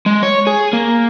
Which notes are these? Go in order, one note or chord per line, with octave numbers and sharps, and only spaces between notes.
G#3
C#5
G#4
A#3